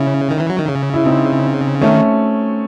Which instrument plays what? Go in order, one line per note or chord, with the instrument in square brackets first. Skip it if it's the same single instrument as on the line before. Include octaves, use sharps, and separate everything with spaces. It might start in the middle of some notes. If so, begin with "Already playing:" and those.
Already playing: [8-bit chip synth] C#3 [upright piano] C#4 E4
[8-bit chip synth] D#3
E3
F#3
D#3
C#3
[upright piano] E4
C4 D#4
[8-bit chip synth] D#3 [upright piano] A3 C#4